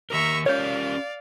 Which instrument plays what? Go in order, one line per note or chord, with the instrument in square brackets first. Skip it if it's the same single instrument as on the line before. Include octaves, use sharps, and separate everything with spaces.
[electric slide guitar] D#3 G4 A#4 [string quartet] E5 A#5 C#6
[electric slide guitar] C#4 G4 A#4 [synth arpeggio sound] C#5 G6 [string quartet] D5 F5